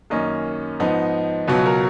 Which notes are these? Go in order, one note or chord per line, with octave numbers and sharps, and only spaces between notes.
F#2 D#3 A#3 C#4 D#5
G#2 F3 B3 D#4
C#2 B2 F#3 B4
A#4